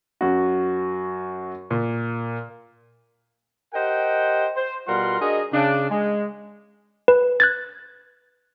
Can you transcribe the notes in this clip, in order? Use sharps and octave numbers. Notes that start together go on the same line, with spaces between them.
F#2 F#4
A#2
G4 A#4 C5 D#5 F#5 G5
C5
B2 G3 F4 A#4 F#5 C6
D4 F#4 G#4 A#4 D#5
C#3 D4
G#3
B4
F#6 G#6 A6